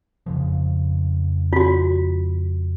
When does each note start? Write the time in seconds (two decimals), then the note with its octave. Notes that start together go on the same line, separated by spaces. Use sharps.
0.26 F2 C#3 F3
1.53 F4 F#4